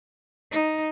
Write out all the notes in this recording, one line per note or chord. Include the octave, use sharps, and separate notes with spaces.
D#4